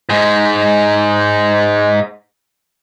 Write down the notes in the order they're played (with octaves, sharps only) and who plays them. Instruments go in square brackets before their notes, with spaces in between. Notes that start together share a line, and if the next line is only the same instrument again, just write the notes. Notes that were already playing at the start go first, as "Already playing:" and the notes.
[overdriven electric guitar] G#2 G#3